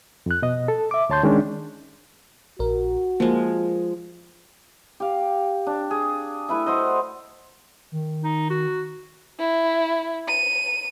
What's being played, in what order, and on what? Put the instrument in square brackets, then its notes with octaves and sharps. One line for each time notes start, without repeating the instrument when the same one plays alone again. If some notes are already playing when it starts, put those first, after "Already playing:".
[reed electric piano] F2 F#6
B2 D#5
A4
E5 D6
D2 C#5 A5 C6 G6
D#3 G#3 C#4 D4
[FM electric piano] A#1 A#4 [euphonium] F#4
[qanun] F3 G#3 [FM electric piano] A#3
[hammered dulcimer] G4 F5
D4
G#4
A3 E4 B4 E5
F#4 C5 D#5
[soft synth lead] D#3
[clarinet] D#4
F#4
[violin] E4
D#7